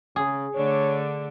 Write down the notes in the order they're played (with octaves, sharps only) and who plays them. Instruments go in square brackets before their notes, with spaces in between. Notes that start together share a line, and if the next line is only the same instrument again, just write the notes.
[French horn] C#3 [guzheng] G#4
[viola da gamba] D3 A3 D4 [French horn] C#5